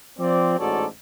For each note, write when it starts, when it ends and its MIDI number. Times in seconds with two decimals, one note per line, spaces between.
0.19 0.56 53
0.19 0.56 60
0.19 0.56 74
0.59 0.86 33
0.59 0.86 44
0.59 0.86 66
0.59 0.86 69
0.59 0.86 73
0.59 0.86 74